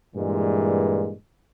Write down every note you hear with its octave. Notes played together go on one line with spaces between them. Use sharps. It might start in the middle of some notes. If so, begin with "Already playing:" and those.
G2 A#2 E3 G#3